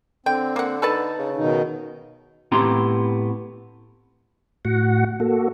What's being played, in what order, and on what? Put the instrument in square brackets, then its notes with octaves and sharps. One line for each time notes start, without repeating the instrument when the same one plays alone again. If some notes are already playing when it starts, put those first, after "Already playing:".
[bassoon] D3 [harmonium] C4 [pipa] G5
[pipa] A#3 F#5
[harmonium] D#4 [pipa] A4 B4 A5
[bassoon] C#3
[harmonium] B2 D#3 D#4
[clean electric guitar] A2 B3 C4 G4 A#5 C6
[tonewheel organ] A2 F#4 F#5
A#3 F#4 A4